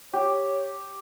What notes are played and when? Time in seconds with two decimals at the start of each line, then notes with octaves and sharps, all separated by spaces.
0.13 G4 C#5